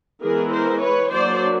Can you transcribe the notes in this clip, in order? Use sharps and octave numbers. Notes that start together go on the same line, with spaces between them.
E3 G#3 B3 E4 G#4 A#4
A#4 C5
B4 C#5
F#3 A#3 D4 C5 D5